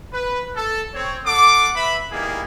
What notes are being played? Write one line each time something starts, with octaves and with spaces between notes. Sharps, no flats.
B4
A4
C4 C#5
A4 F#5 C6 D6
B4 E5 B5
G3 A#3 B3 D#4 E4 G#4